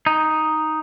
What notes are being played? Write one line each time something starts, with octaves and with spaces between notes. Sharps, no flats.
D#4